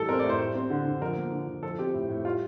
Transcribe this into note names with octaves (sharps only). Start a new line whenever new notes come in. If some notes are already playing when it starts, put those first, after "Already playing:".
Already playing: A2 E3 G3 A4
C4 A#4
D5
A2
C5
G3
C4
D3
D3
F3 A#4
A#3
D3
D3
F3 A4
C4 G4
A2
A2
G3 F4